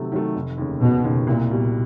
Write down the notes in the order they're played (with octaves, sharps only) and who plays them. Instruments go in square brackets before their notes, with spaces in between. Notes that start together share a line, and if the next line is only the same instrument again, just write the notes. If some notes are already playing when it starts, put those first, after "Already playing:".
Already playing: [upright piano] C3 D#3 F#3 A3
D#3 F#3 A3
F1
D#2 C#3
[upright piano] F1 [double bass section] B2
[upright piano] D#2 C#3
[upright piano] C2 [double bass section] A#2
[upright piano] B2 G3